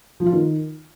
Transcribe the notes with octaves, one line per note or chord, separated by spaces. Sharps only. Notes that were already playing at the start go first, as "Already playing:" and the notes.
F3
F4
D#3